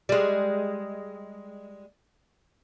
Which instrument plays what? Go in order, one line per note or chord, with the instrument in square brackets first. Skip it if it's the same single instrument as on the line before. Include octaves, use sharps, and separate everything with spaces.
[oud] G3 G#3